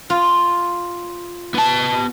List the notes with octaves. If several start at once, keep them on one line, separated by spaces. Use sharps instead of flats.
F4
B3 A5